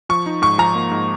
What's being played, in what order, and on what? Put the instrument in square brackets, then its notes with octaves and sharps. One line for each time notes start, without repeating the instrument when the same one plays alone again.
[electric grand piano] F3 [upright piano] C#6
[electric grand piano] D#4
[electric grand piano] G#2 [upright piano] C#6
[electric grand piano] F3 [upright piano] A#5
[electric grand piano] A#3
G#2